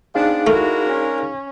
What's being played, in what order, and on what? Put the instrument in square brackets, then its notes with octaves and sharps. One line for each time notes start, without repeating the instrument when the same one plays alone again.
[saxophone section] B3 C4 D4 [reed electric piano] D#4 G#4 F5
[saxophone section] G#3 D4 A#4 [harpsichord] A3 [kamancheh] E4 F#4
[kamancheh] C#4